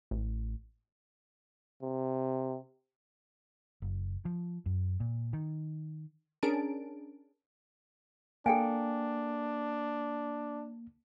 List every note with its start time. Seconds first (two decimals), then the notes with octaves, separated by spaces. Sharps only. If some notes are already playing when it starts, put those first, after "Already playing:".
0.11 A1
1.82 C3
3.82 F#1
4.25 F3
4.66 F#2
5.00 A#2
5.33 D#3
6.43 C#4 D4 G#4 A#4 A5 D7
8.46 A#3 D4 A4 G5 G#5